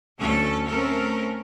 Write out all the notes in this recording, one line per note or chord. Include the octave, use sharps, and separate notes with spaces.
D2 A3 C#4 A4
A3 C4 C#4 A4 A#4